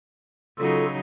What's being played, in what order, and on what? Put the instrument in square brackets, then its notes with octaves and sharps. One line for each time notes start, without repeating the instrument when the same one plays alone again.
[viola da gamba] C#3 F#3 D#4 [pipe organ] F4 A4